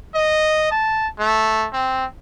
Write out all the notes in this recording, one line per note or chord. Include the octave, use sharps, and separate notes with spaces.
D#5
A5
A3
C4